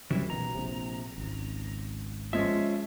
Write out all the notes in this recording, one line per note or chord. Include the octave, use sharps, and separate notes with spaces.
C#2 F#2 C3 D#3 E3 G3
B1 B2 A#5
A#1 C3
G#1 C#2
F3 G#3 C#4 E5